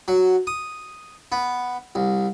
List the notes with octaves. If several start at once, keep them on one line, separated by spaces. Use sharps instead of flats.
F#3
D#6
B3
C2